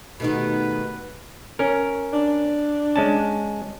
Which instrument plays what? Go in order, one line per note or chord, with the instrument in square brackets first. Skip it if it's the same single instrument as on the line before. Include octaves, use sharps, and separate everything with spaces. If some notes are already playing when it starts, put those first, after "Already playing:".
[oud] B2 D#3 B3 [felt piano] A3 D#4 G4 [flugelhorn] B4
[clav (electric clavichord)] C#4 A#4
[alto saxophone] D4
[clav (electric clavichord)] G#3 C#4 A5